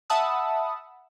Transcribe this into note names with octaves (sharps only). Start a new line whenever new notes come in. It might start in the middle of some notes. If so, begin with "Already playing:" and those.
E5 F#5 A5 B5 D#6 E6